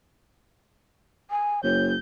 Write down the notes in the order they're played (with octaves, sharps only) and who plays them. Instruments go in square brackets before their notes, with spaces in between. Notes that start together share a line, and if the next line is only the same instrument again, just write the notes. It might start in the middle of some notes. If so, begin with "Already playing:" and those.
[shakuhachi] G#5
[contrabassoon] F#1 [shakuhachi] C#5 [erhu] G6